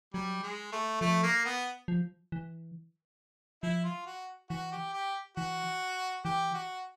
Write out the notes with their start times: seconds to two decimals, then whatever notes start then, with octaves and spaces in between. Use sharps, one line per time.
0.14 F#3 G3
0.43 G#3
0.72 A3
1.01 F3 A3
1.24 A#3
1.46 B3
1.88 F3
2.32 E3
3.63 F3 E4
3.85 F4
4.07 F#4
4.50 E3 F#4
4.72 G4
4.94 G4
5.37 E3 F#4
6.25 E3 G4
6.54 F#4